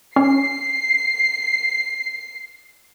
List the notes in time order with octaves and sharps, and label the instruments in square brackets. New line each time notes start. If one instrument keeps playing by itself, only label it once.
[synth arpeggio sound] C#4 [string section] C7